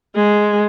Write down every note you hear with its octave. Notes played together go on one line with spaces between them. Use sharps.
G#3